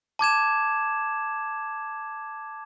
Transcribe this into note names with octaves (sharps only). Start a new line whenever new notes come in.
A5 D6 G#6 E7